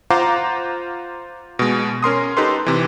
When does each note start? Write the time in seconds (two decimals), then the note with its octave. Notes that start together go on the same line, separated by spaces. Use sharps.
0.10 F4 C5 F5 F#5 A#5 D6
1.59 B2 G#3
2.03 C#4 A#4 C6 D#6
2.37 D#4 G4 A4 B4 C6
2.66 C3 E3